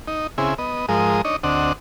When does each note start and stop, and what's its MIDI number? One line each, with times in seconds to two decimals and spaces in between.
0.08 0.27 63
0.38 0.54 49
0.38 0.54 60
0.38 0.54 64
0.38 0.54 68
0.58 0.86 59
0.58 0.86 75
0.89 1.22 44
0.89 1.22 53
0.89 1.22 56
0.89 1.22 70
0.89 1.22 87
1.25 1.36 62
1.25 1.36 63
1.25 1.36 73
1.25 1.36 75
1.43 1.73 38
1.43 1.73 60
1.43 1.73 62
1.43 1.73 75
1.43 1.73 78